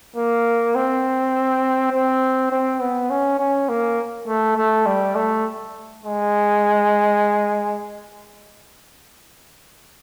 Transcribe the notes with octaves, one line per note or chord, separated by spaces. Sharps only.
A#3
C4
C4
C4
B3
C#4
C#4
A#3
A3
A3
G3
A3
G#3